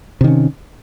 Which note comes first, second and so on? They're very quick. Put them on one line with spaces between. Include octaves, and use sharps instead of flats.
C3 D#3 C#4